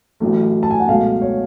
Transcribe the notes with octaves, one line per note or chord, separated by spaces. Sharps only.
A1 A2 F#3 A3
A5
G#5
F#5
C#2 B2 F#3 A3 F5
C#5